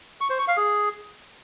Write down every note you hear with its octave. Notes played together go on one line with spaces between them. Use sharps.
C#6
C5
C#6
F5
G#4